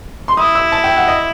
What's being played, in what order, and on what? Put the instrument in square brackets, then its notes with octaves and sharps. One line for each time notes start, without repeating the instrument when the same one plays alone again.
[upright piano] C6
[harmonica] E4 [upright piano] D#6
[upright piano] E6
A5
G5
F#5
D#5